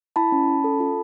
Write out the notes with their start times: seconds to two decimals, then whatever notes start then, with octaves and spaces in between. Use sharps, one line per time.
0.16 E4 A5 B5
0.32 C#4
0.48 C#4
0.64 A4
0.80 F4